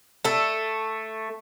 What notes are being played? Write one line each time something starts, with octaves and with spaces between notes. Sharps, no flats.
A3 A4